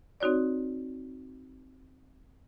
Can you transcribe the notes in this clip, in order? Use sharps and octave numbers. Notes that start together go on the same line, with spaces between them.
C4 D#4 F#4 C#5 D5